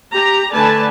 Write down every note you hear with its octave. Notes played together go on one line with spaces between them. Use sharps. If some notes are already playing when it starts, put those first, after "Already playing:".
G4 A#5
D3 A3 B4 D5 G#5 A5